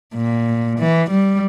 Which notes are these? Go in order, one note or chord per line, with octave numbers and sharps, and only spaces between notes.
A#2
E3
G3